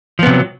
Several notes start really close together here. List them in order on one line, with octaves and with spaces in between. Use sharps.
F3 B3 C3 F#3